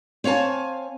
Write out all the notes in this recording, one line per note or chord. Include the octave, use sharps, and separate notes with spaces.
C4 C#5 F5 G#5 A5